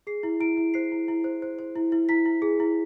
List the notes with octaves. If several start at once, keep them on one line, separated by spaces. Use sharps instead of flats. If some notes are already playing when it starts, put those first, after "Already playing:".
G#4 C7
E4
E4 D7
E4
C5 C7
E4
E4
C5
C5
C5
E4
E4
E4 B6
E4
G#4
E4